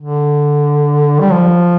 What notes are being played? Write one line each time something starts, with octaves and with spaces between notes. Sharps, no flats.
D3
G3
F3